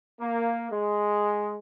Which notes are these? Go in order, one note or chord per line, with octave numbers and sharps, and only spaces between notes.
A#3
G#3